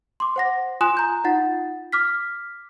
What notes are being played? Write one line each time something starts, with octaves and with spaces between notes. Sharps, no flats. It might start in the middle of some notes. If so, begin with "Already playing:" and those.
C6 D6
C5 F#5 A#6
F4 G#5 C6 D#6 F#6 E7
A#5 G6
D#4 F4 F#5 A6
D6 F6 B6